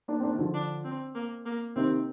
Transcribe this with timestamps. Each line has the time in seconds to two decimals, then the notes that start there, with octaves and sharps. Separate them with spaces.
0.08 A#3 D4
0.20 C4
0.23 A#3 D4
0.33 D#3
0.39 D3 F3
0.54 D4
0.84 C4
1.15 A#3
1.45 A#3
1.76 C3 D#3 C4